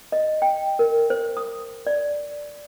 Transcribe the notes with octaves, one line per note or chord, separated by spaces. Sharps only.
D#5
G5
A#4
C5
D#6
D5